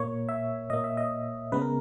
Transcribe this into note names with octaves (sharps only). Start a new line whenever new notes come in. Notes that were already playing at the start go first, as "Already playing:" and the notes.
Already playing: A#2 A#3 C#5
E5
A#2 A#3 D#5
E5
D#5
C#3 G#3 B3 B4
A#4